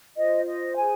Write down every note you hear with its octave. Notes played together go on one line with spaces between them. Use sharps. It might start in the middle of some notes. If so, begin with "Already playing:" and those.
F4 C5 D#5
D#5
G#4 G#5